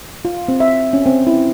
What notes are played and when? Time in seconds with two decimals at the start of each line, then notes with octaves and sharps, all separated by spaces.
0.25 F4
0.48 C4
0.60 E5
0.93 C#4
1.06 C4
1.27 E4